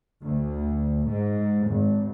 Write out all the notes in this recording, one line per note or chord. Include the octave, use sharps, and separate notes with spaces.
D2
G#2
G#1